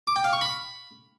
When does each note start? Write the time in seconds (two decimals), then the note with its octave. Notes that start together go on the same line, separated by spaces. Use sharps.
0.07 D6
0.16 G5
0.24 F5
0.33 C#6
0.41 B5